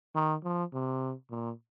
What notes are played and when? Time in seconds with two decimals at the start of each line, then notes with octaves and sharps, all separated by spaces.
0.15 D#3
0.43 F3
0.73 C3
1.30 A#2